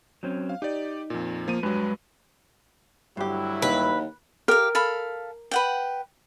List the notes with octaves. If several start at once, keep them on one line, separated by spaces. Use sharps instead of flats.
F#3 C4 C#4
F5
D#4 G4 D5
F2 A#2
F3 A#3 D#7
G2 F#3 G#3 B4
D2 G2 F#3 E4 G4
D#2 B4
G4 A#4 F5
A4 F5 B5
B4 F#5 G5